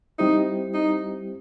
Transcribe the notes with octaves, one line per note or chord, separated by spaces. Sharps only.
G3 C4 D#4 E4 G4 C5
D#4